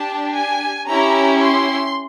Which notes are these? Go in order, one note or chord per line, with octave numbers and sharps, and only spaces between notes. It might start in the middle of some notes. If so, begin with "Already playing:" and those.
Already playing: D4 G4 A5
G#5
C#4 E4 G4 A#5
C6